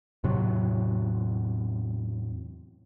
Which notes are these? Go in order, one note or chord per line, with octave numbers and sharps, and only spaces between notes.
E2 A2 C3 F#3